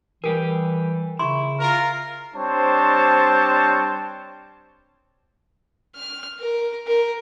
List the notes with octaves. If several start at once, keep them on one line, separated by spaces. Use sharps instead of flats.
E3 G3 G4 G#4 A#4
C#3 E4 C6 C#6
F4 A#4
G3 C4 D4 C5 C#5 A5
F6
A#4
A#4